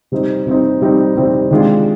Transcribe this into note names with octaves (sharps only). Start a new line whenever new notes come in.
C3 G3 C4 D#4
C3 G3 C4 D#4
C3 G3 C4 D#4
C3 G3 C4 D#4
C3 D#3 G#3 D4 F4